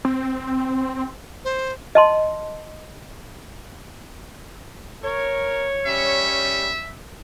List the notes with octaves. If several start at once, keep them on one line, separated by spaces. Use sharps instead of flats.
C4
C5
D#5 A5 C6
A#4 C#5
G3 C#4 E5